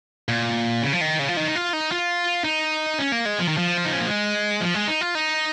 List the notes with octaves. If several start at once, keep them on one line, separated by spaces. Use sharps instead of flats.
A#2
C#3
F3
D#3
C#3
F3
D#3
D#4
F4
D#4
F4
D#4
C#4
A#3
G#3
F3
D#3
F3
F4
D#4
C#4
A#3
G#3
F3
G#3
D#4
F4
D#4